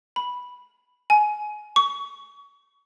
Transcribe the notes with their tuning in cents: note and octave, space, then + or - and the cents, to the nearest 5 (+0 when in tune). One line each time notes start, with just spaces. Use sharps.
B5 -5
G#5 +20
C#6 +30